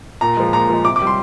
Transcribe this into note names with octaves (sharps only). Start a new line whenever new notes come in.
A#2 A#5
F3 G#3
A#2 A#5
F3 G#3
C3 D6
D6
G3
C6